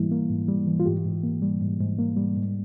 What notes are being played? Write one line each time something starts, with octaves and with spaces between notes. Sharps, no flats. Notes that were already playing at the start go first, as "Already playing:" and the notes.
Already playing: G#2 E3 G3 A#3 E4
A#3
G#2
G3
E3
F4
G#2 G4
G#2
A#3
G3
G#2
G#2
A#3
G3
G#2